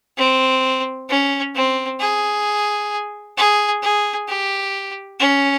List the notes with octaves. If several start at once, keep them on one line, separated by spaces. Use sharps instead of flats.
C4
C#4
C4
G#4
G#4
G#4
G4
C#4